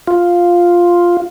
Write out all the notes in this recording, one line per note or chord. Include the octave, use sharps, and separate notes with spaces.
F4